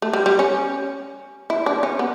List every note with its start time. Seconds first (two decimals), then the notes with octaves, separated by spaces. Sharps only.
0.02 A3
0.13 G3
0.26 G3
0.39 C#4
1.50 E4
1.66 D4
1.83 C#4
1.99 B3